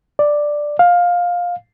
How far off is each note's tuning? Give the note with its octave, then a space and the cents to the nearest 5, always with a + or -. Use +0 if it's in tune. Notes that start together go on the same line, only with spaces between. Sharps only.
D5 +5
F5 +15